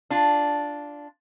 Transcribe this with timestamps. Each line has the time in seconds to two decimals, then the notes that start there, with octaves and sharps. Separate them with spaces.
0.10 D4 F4